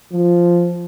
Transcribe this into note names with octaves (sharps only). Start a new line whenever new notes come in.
F3